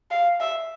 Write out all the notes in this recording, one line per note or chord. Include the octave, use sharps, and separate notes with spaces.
F5
E5